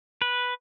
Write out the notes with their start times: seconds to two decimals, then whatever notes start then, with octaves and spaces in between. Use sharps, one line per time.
0.22 B4